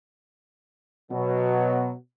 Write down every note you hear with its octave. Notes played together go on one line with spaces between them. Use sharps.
B2 F#3